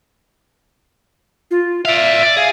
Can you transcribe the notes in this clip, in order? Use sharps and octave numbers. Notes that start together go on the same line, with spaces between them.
F4
D5 E5 F5
D5
G#4 F5